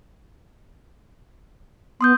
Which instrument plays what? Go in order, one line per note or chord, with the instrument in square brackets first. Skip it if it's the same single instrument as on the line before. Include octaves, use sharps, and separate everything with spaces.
[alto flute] B3 [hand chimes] C6 D#6 G6